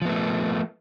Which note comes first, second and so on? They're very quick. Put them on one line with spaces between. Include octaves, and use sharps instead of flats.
F3 B3 A3